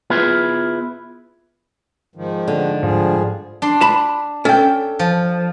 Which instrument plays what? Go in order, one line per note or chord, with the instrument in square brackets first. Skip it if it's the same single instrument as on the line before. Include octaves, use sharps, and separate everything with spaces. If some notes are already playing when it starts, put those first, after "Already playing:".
[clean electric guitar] B3 E4 F4 G#4 B4
[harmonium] G#2 D#3 F3
[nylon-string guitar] D3
[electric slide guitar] G#2 [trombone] F3 [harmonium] G3 G#4
[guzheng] D4 C6
[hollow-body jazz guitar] A5 B5
[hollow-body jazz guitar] C#4 [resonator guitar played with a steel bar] A4 G5
[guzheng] F3